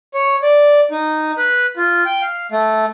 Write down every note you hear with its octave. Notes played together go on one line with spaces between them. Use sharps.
C#5
D5
D#4
B4
F4
G5
F5
A3